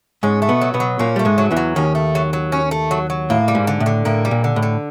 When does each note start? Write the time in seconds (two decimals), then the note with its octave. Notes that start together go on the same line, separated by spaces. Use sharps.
0.23 G#2 G#3 C#4
0.42 A3
0.49 B2 B3
0.62 F#3
0.74 B2 B3
0.80 F#3
0.99 A#2 A#3 C#4
1.16 G3 A3
1.25 G#2 G#3
1.38 F#3
1.51 E2 E3
1.57 F#3
1.76 D#2 D#3 C#4
1.95 A3
2.15 F#3
2.33 F#3
2.52 C#4
2.71 A3
2.91 F#3
3.10 F#3
3.30 A2 A#3
3.48 G3
3.55 G#2
3.67 D3
3.80 A2
3.86 D3
4.05 A2 A#3
4.25 G3
4.31 A#2
4.44 D3
4.56 A2
4.63 D3